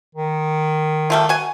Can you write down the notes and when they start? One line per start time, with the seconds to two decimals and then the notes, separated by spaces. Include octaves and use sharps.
0.15 D#3
1.10 G3 A3 F4
1.29 F#4 G#5